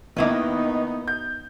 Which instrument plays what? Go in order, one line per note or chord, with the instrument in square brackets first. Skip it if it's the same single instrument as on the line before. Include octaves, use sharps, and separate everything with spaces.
[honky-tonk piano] D#3 D#5 [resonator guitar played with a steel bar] A#3 E4 B4 [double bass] B3 D#4
[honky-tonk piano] G6